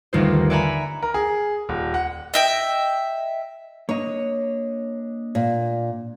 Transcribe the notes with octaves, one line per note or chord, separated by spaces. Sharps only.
G1 D#2 A3 F4 A#4 C5
D5 E5 F#5 G#5 A#5 B5
A#4
G#4
D#1
F#5
D#5 E5 G5
A#3 D4 C#5 D#5
A#2